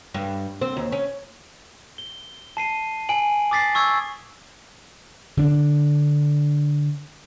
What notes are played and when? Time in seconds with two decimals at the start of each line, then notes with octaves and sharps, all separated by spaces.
0.14 G2
0.61 C4
0.77 D#2
0.92 C#4
1.98 G7
2.57 A5 C7 D#7
3.09 G#5 D7 D#7 F#7
3.51 D6 D#6 A6 B6 C7
3.75 C#6 E6 G#6 C7
5.37 D3 D4